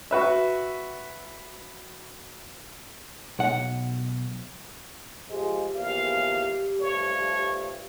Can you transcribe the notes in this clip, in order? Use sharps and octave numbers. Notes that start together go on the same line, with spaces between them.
F#4 B4 E5
B1 F#5
F3 G#3 G4
A#1 E2 F5
G2 F3 A3 C#5